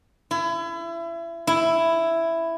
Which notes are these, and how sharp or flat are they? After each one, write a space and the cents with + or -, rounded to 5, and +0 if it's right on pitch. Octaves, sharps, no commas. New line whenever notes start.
E4 +30
E4 +5